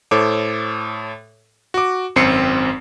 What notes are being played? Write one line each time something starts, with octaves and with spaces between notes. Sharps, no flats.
A2 A4 C5 C#5 D6
F#4 D6
G#1 F#2 C4 C7 C#7